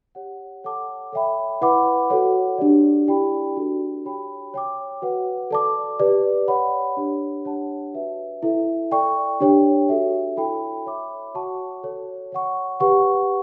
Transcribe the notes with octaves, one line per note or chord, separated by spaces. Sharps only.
G4 C#5 F#5
A4 C#5 F#5 A5 D6
A4 C#5 E5 G5 B5
E4 B4 F#5 B5 D6
F#4 A4 C#5 F#5
D4 G4 D5
E4 G4 D5 G5 B5
D4 F#4 A4
G4 C#5 G5 B5
C#5 G5 D6
F#4 B4 F#5
A4 D5 A5 D6
G4 B4 D5
C#5 F#5 B5
D4 G4 C#5
D4 G4 C#5 F#5 A5
F#4 B4 E5
E4 A4 E5
A4 D5 G5 C#6
D4 G4 C#5 G5
F#4 A4 E5
E4 A4 C#5 G5 B5
C#5 E5 B5 D6
F#4 C#5 F#5 A5 C#6
F#4 A4 C#5
C#5 F#5 C#6
G4 B4 F#5 C#6